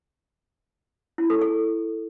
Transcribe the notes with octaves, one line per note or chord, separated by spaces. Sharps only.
E4
A4
G#4